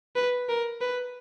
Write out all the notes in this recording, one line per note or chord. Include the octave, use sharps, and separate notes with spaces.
B4
A#4
B4